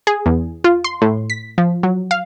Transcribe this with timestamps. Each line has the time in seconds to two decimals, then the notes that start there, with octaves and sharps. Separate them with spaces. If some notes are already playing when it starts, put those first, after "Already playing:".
0.07 G#4
0.26 E2
0.64 F4
0.84 C6
1.02 A2
1.30 B6
1.58 F3
1.83 F#3
2.11 F5